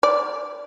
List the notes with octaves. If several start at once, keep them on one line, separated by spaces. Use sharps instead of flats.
D5